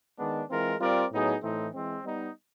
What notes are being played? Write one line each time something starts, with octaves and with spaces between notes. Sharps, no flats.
D#3 G#3 B3 D4
E3 G#3 C4 F4 A#4
G3 C4 F4 A#4 D5
A2 F#3 B3 D#4 G#4
A2 E3 A3 C4 D#4
E3 G#3 C4
G3 B3 D#4